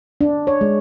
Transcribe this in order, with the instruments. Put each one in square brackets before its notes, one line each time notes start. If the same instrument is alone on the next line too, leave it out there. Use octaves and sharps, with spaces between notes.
[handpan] D4
C#5
G#3